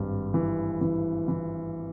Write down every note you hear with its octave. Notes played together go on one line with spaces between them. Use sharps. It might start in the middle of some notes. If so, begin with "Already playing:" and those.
Already playing: G#1 G2
E3
E3
E3